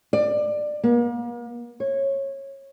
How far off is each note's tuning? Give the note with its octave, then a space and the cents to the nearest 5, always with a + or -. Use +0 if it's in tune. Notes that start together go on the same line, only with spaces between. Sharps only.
D5 +20
A#3 +40
C#5 -20